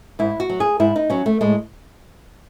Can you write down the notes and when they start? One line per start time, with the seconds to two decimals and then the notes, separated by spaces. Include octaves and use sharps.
0.19 G#2 E4
0.40 F#4
0.50 F#3
0.60 G#4
0.80 G#2 E4
0.96 D#4
1.10 F#3 C#4
1.26 A3
1.41 A2 G#3